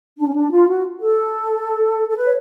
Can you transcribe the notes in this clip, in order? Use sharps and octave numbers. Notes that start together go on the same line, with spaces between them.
D4
C#4
D4
F4
F#4
A4
A4
B4
C#5